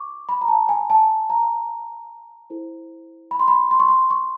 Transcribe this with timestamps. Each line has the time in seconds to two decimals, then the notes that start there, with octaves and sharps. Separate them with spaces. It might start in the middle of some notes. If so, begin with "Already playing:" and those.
Already playing: C#6 D6
0.29 B5
0.41 A#5
0.48 A5
0.69 G#5
0.90 A5
1.30 A#5
2.50 E4 A4 C5
3.31 B5
3.40 C6
3.48 B5
3.71 C6
3.80 C#6
3.88 C6
4.10 C#6